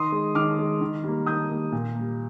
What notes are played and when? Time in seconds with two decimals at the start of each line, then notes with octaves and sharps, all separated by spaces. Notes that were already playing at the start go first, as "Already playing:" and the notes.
Already playing: D#3 C6 D#6
0.12 G#3
0.35 D#3 D6 F6
0.59 G#3
0.81 D#3
1.04 G3 A#3
1.26 D#3 D#6 G6
1.50 G3 A#3
1.72 A#2
1.95 A#3
2.01 G3